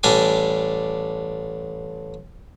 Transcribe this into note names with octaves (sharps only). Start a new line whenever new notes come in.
A1 G3 D4 G#5 D6